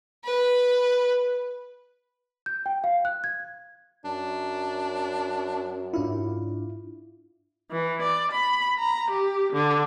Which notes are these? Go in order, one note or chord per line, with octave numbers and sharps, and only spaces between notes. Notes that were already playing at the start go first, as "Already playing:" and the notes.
B4
G6
G5
F5
F#6
G#6
F#2 D4
G#2 D4 E4 F4
E3
D5
B5
A#5
G4
D3